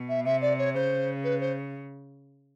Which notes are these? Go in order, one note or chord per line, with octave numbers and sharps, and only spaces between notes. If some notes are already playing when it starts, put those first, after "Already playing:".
Already playing: B2
E5
C3 E5
D5
C#5
C#3 C5
B4
C5